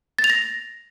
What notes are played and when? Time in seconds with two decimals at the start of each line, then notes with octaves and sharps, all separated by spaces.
0.19 A6
0.24 F7
0.30 A#6